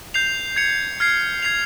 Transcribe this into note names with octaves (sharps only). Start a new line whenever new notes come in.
G6 C7 F7
G#6 C#7 F7
F6 G#6 C7
G#6 C7 F7